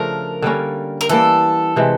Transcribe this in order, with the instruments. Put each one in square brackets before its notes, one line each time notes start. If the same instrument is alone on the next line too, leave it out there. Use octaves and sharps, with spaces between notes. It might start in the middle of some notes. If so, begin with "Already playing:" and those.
Already playing: [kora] C#3 F3 A3 D4 [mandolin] A#4
[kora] D3 G3 A#3 C#4
[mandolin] A#4
[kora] E3 G3 A#3 [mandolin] A4
[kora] C3 E3 G#3